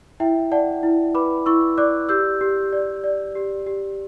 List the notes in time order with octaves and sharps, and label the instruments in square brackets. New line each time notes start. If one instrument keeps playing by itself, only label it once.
[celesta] E4 E5 G5
D5 F#5 A5
E4
B4 B5 D6
E4 C#6 E6
D5 D6 F#6
G4 E6 G6
G4
D5
D5
G4
G4